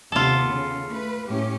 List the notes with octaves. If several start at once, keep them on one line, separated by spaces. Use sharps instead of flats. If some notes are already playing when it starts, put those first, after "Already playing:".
D#2 C3 B3 F4 A4
C#3
A3 B4
A2 C#4 G4